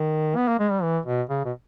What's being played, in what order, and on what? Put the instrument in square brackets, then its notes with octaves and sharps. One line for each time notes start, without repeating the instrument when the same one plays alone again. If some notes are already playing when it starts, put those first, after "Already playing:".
Already playing: [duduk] D#3
B3
A#3
G#3
G3
E3
B2
C#3
B2